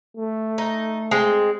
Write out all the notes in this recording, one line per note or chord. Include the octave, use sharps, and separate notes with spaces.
A3
D#4
G#3 C4